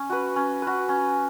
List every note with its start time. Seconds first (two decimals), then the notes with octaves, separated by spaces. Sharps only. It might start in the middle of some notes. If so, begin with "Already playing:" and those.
Already playing: C#4
0.10 F#4 B4
0.36 C#4
0.62 F#4 B4
0.89 C#4